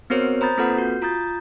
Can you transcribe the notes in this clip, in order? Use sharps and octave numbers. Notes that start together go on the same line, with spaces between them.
B3 C4 F#4 A#4 C5 C#5
C5 A#5 B5 D#6 G6 A6
A#3 C4 F4 A4 B4 F#5
F#4 G6
F4 A#5 D#6 G6 A6